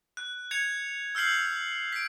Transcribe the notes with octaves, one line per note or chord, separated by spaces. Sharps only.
F#6
G#6 C#7 F7
E6 F6 G6 C7 F#7
B6 D7